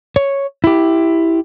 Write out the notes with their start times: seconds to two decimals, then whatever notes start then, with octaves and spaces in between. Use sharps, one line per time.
0.16 C#5
0.64 E4 G4